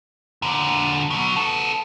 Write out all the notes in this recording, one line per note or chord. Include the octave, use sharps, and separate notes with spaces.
A#2 D3
B2 F#3
B3 A4